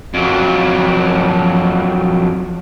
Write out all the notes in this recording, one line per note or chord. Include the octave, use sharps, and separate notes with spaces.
F2 F#3